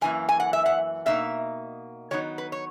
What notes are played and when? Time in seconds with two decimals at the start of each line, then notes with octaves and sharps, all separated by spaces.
0.01 F#2 E3 A#3 G#5
0.29 G#5
0.40 F#5
0.53 E5
0.66 F#5
1.06 B2 A#3 D#4 E5
2.11 D#3 F#3 B3 D#4 C#5
2.38 B4
2.52 C#5